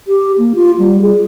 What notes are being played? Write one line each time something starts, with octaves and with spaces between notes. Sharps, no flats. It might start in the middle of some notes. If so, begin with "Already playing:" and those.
G4
A#3
F4
G3
G#4